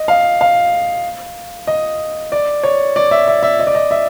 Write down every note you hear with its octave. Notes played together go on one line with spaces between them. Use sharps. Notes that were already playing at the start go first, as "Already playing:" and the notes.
Already playing: D#5
F5
F5
D#5
D5
C#5
D5
E5
E5
E5
D#5
D5
D#5
E5